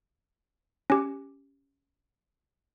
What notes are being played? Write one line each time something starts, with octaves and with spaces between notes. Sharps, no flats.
C#4 G4